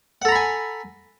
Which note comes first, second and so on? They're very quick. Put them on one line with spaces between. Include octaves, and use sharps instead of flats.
F#5 A4 A#5 B5 G#5